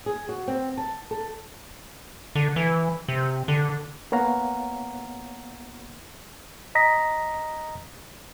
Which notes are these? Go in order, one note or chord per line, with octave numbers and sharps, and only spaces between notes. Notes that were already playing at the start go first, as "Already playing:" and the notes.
G#4
F#4
C4
A5
A4
D3
E3
C3
D3
A#3 B3 C#5 F5 F#5 A#5
D#5 A#5 D#6 A#6 B6